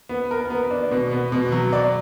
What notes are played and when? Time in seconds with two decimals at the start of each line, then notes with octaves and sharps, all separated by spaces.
0.09 B3
0.31 A#4
0.50 B3
0.71 D4
0.91 B2
1.12 B3
1.32 B2
1.52 F#3
1.73 D5